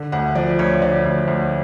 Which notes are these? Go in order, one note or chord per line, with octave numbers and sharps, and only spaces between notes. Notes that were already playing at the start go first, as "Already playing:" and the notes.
Already playing: D3
D2 F#5
F3 D5
D2 C#5
D3 D5
D2
D2